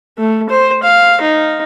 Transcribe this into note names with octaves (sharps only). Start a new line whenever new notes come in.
A3
C5
F5
D#4